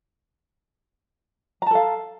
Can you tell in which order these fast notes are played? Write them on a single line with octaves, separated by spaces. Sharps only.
A#5 A5 A4 F5